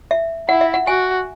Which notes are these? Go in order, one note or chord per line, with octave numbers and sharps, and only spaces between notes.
E5
E4 F#5
E5
F#5
F#4 G#5